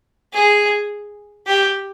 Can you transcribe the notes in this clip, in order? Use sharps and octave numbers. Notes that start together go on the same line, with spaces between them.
G#4
G4